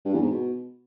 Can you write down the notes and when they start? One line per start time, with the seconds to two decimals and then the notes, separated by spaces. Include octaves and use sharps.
0.05 G2
0.14 E2
0.22 G#2
0.31 B2